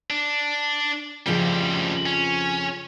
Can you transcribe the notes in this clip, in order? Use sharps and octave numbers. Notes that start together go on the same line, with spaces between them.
D4
F2 A2 C#3 F3 G3
C#4